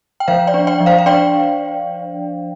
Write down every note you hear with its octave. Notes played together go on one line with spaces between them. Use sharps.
G5
F3 C5 F5
D5 G5
D4
D5 G5
F3
C5 F5
F5
D4 D5 G5